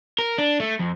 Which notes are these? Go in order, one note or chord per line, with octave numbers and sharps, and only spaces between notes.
A#4
D4
A3
F2